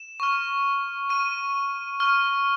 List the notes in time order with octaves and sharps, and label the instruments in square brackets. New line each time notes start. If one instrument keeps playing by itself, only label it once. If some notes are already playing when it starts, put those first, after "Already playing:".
Already playing: [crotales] E7
C#6 F6
C#6 F6 D#7
C#6 F6